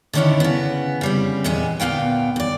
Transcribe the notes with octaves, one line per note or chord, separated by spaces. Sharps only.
D3 D#3 B3 C#4 D4 E4
C#3 B3
C#3 G3 C4
E2 A#2 G#3 B3 G#4
D2 A#2 B3 F5 G5
F#2 D5